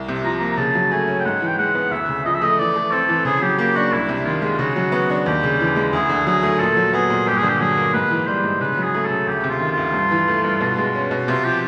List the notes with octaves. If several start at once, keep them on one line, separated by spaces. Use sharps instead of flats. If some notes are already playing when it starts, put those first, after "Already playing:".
Already playing: C2
C3
F3 A#5
A#3 A#5
A#5
C#3 A5
F#3
A3 G#5
C#4
G5
G#2 F#5
E3
G5
G#3 F#5
B3
D2 E5
C#3
F3 D#5
E5
A3 D#5
E3 D5
A3
C4 A4
E3
C#3 G#4
F#3 G4
A#3 G4
D4 F#4
C2 E4
C3
D#3 F4
G#3
F4
C#3 F#4
F#3
B3
D4
D#2 G4
C#3
E3
G#3
D2 G#4
D3
F#3 G#4
A3
A#2 A4
F#3
B3 G#4
A#2
G2 G4
G#4
D3
G4
F#3 G#4
A#3
G#2 B4
E3
G3 C5
G#2
C#3 B4
F#3 G#4
A3
A4
C#3
D2 G4
C3
F4
D#3
F4
D2
G2
E3
A3
G2
B2
G#3
C#4
B2
C3 F4
F3 G4